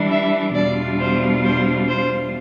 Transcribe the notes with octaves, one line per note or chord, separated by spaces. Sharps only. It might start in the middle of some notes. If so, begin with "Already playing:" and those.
Already playing: E3 G3 D4
E5
E2 B2 G3 D4 F4 D5
C5
C5
C5